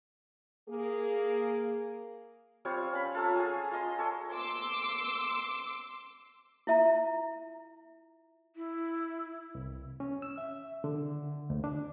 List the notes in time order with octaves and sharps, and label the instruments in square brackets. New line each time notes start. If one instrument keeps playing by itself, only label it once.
[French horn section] A#3 G#4
[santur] G3 C4 F4 C#5
C#4 F5 B5
F4 A4 C#5 A#5
G#4 F#5 G#5
F4 D#5 C6
A4 C#5 D#5
[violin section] C6 D6 E6
[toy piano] E4 F4 E5 A#5
[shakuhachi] E4
[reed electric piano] C2
C#4
E6
E5
D3
D2
D4